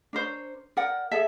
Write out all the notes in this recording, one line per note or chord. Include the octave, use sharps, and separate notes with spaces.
D4 A#4 C5 C#5
A#4 D5 F#5 G5
G#4 A4 E5